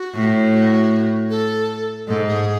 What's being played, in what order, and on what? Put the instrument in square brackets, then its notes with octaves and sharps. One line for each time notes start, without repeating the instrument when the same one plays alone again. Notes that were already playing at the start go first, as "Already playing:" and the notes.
Already playing: [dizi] F#4
[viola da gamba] A2
[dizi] F#4
A4
[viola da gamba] G#2 [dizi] A4
[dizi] G#4